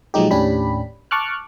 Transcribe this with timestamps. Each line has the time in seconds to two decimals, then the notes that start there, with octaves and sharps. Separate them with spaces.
0.14 A#2 F3 F#3 G#3 D#4 G4
0.31 D#2 A2 C#4 D4 G4 B5
1.11 A5 C#6 D6 F6 F#6